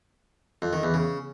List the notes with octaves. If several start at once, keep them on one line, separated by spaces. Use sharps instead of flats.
F2
D#3
E2
C#3